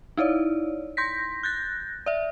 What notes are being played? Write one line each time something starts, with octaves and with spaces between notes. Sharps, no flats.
D#4 E4 C#5 D5
C6 G6 A#6 B6
F#6 G6 A6 A#6
D5 E5